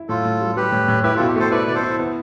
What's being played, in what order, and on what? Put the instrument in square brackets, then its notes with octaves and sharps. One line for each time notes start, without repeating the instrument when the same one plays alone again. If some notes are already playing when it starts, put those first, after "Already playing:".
Already playing: [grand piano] E4
[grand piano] A2 [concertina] F4 A4
[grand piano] A2
G3
[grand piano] G3 [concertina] G4 B4
[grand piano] A2
A2
[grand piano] E4 [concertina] G4 B4
[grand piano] B2 [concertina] F4 A4
[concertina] G4
[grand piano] A3 [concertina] A4 C5
[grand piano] E4 [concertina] B4 D5
[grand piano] B2 [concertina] D5
[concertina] A4 C5
[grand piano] E4
B3